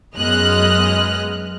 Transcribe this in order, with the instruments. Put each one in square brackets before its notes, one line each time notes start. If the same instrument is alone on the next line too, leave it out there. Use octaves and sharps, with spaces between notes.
[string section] F#2 G#3 B3 D#5 F6 F#6